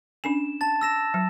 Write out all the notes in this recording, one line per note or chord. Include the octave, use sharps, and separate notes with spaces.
C#4 D4 G#5 E7
A5 A6
E6 A#6 E7
F#3